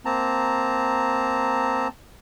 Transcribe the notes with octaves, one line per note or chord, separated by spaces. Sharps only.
A#3 C4 A5 A#5